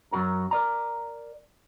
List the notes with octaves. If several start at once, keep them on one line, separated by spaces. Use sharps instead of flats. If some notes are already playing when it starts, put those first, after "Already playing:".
F#2 B2 F#4 A#4 A#5
A#4 D5 A#5